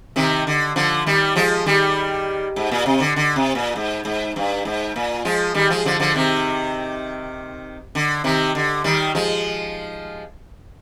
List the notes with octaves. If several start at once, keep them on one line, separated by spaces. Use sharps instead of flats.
C3 D#3
D3
D3 F3
D#3 G3
F3 G#3
D#3 G3
G#2
A#2
C3
D3
D3
C3
A#2
G#2
G#2
G2
G#2
A#2
F3 G#3
D#3 G3
F3 G#3
D3 F3
D3 F3
C3 D#3
D3
C3 D#3
D3
D#3 G3
F3 G#3